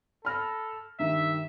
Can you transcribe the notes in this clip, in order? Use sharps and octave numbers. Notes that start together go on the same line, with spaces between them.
A4 B5 F6 A#6
G2 D#3 G3 E5